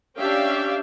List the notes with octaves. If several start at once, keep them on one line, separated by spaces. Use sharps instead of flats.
C#4 D4 G4 E5 F5 G5